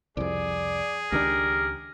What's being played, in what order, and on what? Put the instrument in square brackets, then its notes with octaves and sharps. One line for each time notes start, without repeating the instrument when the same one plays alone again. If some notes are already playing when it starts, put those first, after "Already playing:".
[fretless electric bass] C2 F2 [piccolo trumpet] G#4 [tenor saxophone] D5
[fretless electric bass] C#2 D#3 D4 [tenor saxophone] G4 [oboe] A#4